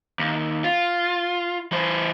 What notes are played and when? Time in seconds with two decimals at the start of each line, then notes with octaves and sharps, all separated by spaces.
0.19 D#2
0.64 F4
1.72 E3 C5